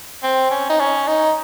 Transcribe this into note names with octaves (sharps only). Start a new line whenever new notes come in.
C4
C#4
D#4
C#4
D#4